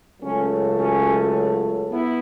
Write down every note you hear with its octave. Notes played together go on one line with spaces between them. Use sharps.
C#2 C#3 F#3 A3 C#4
C#4 F#4
B3 E4